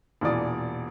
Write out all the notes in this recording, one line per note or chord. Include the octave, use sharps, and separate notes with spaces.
E1 A#2 E3 D5 D#6